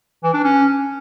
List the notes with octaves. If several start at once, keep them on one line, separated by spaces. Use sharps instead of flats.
E3
D4
C#4